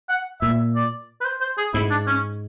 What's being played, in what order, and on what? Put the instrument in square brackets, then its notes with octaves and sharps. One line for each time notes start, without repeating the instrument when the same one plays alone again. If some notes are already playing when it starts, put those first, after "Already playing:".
[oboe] F#5
[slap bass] A#2 [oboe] E5
[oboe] D5
B4
C5
C5
G#4
[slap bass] G#2 [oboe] E4
[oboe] D4
C#4